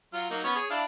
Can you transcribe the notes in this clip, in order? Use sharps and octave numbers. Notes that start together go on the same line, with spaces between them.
F#3 F4
F#3 A#3 D#4
B3 C#4 C#5
G#4 C#5
D4 E4 F5